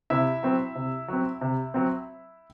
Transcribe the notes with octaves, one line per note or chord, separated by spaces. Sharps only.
C3 E4 E5
F#3 C4
C3
F#3 C4
C3
F#3 C4